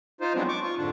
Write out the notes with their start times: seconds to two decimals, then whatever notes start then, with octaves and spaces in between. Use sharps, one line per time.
0.21 D#4 F4 C5
0.35 F3 F#3 G#3 B3 C4 D4
0.48 C#6 D6
0.63 F4 C#6
0.77 F2 G#2 D3 D4